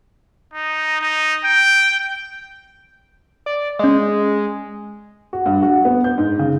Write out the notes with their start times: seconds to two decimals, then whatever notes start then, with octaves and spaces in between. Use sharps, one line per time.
0.53 D#4
1.01 D#4
1.44 G5
3.46 D5
3.79 G#3 C#4 D#5
5.33 F#4
5.46 G2
5.62 F#4
5.85 B3
6.04 G6
6.18 G#2
6.39 C#3